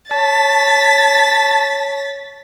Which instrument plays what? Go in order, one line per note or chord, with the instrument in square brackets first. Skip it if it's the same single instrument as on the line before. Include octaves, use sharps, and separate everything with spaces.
[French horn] C#5 [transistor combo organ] A5 [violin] A6 B6